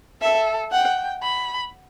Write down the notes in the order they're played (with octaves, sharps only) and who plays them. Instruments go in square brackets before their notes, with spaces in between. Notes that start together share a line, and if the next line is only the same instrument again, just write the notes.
[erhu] A4 [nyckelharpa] E5
[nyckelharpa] F#5 [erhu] G5
[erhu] B5